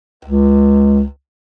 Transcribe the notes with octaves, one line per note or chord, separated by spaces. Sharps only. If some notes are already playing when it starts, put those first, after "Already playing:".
C#2